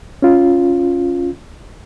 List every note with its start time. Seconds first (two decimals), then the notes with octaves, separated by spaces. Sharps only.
0.22 C#4 F4